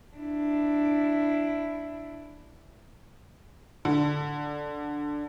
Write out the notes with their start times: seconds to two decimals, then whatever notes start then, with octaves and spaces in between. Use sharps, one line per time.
0.16 D4 E4
3.85 D3